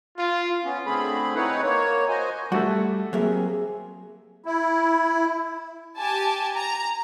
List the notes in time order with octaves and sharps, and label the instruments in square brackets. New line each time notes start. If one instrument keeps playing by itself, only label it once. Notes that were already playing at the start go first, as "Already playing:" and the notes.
[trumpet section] F4
[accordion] B3 C#4
D3 A3 C4 G#4 B5
C4 D#4 E4 B4 C#5 F#5
A#3 C#5
F#4 C5 D#5 G#5
[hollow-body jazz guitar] G3 [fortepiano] A3 F#4
[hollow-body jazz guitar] F#3 A#3 E5 [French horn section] C4 G4 G#4
[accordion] E4
[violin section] G4 G#5 A5
A#5